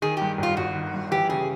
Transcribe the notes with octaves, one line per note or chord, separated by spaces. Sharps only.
D#3 G#4
G2 G4
G1 F4
G1 F#4
D#3
G2
E3 G4
C#3 G#4